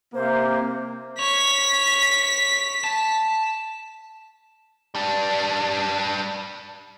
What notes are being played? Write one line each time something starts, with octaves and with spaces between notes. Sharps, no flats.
C3 A#3 C5
C#5 B6
A5
G3 D4